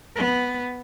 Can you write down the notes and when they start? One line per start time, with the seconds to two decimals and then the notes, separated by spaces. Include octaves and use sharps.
0.16 B3